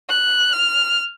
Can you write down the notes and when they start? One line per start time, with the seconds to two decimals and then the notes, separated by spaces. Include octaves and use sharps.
0.10 F#6
0.52 F6